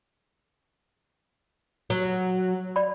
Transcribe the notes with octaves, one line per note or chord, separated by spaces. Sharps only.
F#3
D5 B5